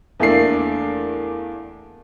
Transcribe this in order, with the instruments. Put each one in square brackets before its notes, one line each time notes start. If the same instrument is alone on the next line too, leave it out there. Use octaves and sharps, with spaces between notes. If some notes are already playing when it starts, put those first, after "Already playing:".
[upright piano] E2 A3 A#3 D4 C7